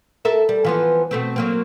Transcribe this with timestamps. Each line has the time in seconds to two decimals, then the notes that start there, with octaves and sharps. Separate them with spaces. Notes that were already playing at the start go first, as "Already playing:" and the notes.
0.25 A4 A#4 E5
0.49 G3
0.65 E3 F3 B3
1.11 B2 A3 C4
1.36 F#3 A#3 C4